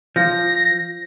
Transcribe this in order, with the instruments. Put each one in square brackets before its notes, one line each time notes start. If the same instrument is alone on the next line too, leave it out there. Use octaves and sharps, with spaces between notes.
[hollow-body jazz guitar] F3 [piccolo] A#6